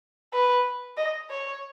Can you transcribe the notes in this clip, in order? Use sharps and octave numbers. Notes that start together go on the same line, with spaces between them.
B4
D#5
C#5